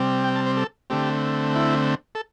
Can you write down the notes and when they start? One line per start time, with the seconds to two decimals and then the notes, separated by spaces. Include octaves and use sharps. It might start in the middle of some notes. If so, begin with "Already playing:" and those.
Already playing: C3 G3 C4
0.24 G5
0.35 A5
0.46 C5
0.57 A4
0.90 D3 A3 C4 G4
1.55 E4
2.15 A4